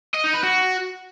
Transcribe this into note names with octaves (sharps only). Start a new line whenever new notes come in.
D#5
D#4
B4
F#4